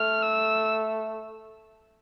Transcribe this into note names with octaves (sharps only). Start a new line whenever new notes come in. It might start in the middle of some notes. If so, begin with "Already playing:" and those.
Already playing: A3 F6
E6